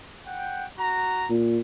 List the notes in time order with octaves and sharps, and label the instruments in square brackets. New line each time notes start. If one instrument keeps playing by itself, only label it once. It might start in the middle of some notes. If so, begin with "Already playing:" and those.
[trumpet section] F#5 G5
F#4 A#5
[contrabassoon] A#2